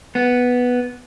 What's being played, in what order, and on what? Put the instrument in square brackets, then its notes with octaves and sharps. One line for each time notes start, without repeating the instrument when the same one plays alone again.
[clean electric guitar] B3